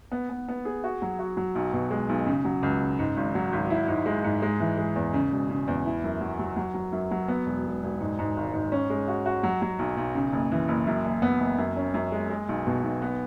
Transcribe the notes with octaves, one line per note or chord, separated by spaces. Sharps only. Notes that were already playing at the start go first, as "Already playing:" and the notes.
B3
B3
B3
G#4
F#4
F#3
F#4
F#3
B1
B2
G#3
B1
C#3
F#3
C#2
C#3
G#2
G#1
F#3
G#1
E4
G#2
G#3
G#2
G#3
E3
G#3
E2
C#3
E1
C#3
E2
E4
F#2
F#3
F#3
F#3
F#3
F#2
F#3
B3
E1
E1
E1
G#2
G#2
G#1
G#2
C#4
G#3
F#4
F#4
F#3
F#3
B1
B1
C#3
F#1
E3
F#1
F#2
F#1
B3
F#1
F#2
C#4
F#2
G#3
G#3
B1
B2
B1
B3